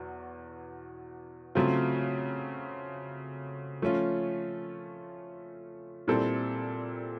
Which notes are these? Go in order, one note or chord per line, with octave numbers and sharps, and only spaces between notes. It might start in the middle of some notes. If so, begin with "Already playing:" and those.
Already playing: E2 B2 F#3
C#3 F#3 A3 C4 F4
F3 A3 C#4 F4
A#2 G3 C4 E4 A4